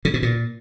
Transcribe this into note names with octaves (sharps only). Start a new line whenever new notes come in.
C#3
B2
A#2